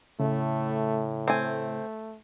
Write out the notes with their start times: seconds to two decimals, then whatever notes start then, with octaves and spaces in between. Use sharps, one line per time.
0.20 A2 C#3 A3
1.28 A3 C4 G#5